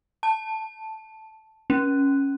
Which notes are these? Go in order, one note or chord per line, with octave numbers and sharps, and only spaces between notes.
A5
C#4